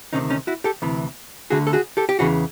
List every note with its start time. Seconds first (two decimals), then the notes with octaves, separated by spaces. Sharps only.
0.13 D2 C3 D#3 C#4 D#4
0.30 C#4 D#4
0.47 E4 F#4
0.64 G4 A4
0.82 D2 C3 E3
1.50 D2 D3 F#4 G#4
1.67 A4
1.73 F#4 G#4
1.97 G4 A4
2.09 G4
2.19 E2 C#3 E3 F#4 G#4